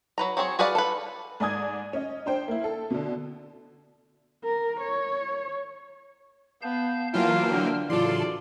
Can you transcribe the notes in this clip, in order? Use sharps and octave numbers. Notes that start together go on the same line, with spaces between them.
F#3 B4 A#5
F#3 C4 G#4 C#5
F#4 G#4 B4 D5 F5
A4 B4
G#2 D5 G#5 D#6 G#6
C#4 D#5
D4 C5 G5
A#3 E4
A4
B2 D3
A#4
C#5
B3 F5 A5 G6
E3 F#3 A#3 F4 G5 A5 F6
D3
A2 C#3 E3 F#3 F4 A4 D5 C6